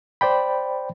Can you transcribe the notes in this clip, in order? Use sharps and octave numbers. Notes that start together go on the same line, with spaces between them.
C5 D5 G5 B5